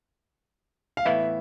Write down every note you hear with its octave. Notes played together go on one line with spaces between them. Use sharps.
F5
A2 E3 B3 E4 E5